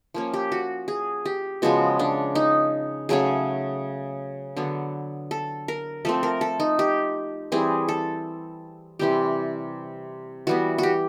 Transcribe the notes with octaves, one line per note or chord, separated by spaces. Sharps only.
F3 A#3 C#4
G4
F#4
G#4
G4
C#3 F3 G#3 B3 F#4
D4
D#4
C#3 F#3 A3 C#4 G#4
D3 F#3 B3
A4
A#4
F3 A3 C4 A4
A#4
A4
D#4
G4
E3 G3 C4 G#4
A4
C3 E3 G3 C4 G4
E3 G3 B3 F#4
F#4 G4